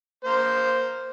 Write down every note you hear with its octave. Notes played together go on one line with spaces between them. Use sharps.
A#3 C5